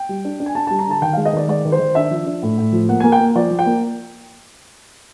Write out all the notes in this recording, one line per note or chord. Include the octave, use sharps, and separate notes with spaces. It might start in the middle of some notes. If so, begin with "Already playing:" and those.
Already playing: G5
G3
D4
D4
G#5
D4 A5
G3 A5
A#5
D3 A5
D#3 G5
G#3 F5
D#5
D#3 D5
G#3 D5
D#3
C5
D#3
D4 E5
F3
D4
A2
A2
F3
A#3 F#5
A#3 G#5
G5
A#3
F3 D5
F3
G5
A#3